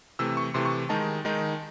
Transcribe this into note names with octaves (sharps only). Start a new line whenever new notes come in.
C3 E3 A3 E6
C#6
C3 E3 A3 C6
C#6
D#3 G#3 D#4 A5
D#3 G#3 D#4